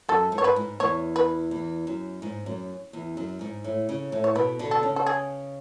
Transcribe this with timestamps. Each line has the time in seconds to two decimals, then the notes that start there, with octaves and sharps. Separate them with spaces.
0.09 F#2 A4
0.32 G#2
0.38 C#5
0.44 B4
0.56 G#2
0.80 E2 C#5
1.16 B4
1.51 E2
1.87 F#2
2.22 G#2
2.46 F#2
2.93 E2
3.17 F#2
3.41 G#2
3.64 A2
3.89 C#3
4.12 A2
4.24 C#5
4.35 B2 B4
4.59 B2 D3
4.71 A4
4.83 C#3
4.96 A4
5.06 G#4